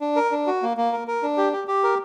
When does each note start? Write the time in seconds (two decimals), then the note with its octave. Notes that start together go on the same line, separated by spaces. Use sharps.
0.01 D4
0.16 A#4
0.32 D4
0.47 F#4
0.62 A#3
0.77 A#3
0.93 A#4
1.08 A#4
1.23 D4
1.37 G4
1.53 G4
1.68 G4
1.84 A#4